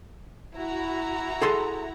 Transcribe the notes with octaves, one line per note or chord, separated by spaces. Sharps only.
E4 F#4 A#5
G#4 A4 C6